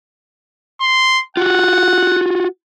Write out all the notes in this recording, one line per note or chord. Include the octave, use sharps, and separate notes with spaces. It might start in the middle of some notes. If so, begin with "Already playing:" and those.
C6
F4 F#4 F#5